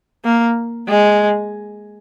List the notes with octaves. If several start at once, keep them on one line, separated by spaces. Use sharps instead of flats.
A#3
G#3